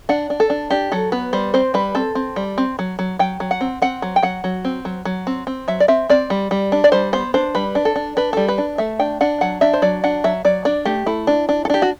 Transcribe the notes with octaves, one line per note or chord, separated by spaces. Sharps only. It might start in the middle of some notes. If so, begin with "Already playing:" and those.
D4 F#5
D4
A4
D4
D4 G4
F#3 A4
B3 B4
G3 C5
C4 C5
G3 B4
C4 A4
C4
G3
C4
F#3
F#3
F#3 G5
F#3
F#5
C4
C4 F#5
F#3
G5
F#3 F#5
F#3
C4
F#3
F#3
C4
C4
F#3 E5
D5
C4 E5
C4 D5
G3
G3
D4
D5
G3 C5
B3 C5
D4 C5
G3 B4
D4
A4
D4
D4 B4
G3 A4
B4
D4
A3 E5
D4 G5
D4 F#5
F#3 F#5
D4 E5
C5
F#3 D5
D4 F#5
F#3 E5
F#3 D5
D4 D5
A3 G4
A3 E4
D4
D4
A4
D4 G4
F#4